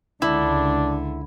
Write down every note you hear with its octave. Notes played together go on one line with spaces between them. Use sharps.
C#2 D3 D4 E4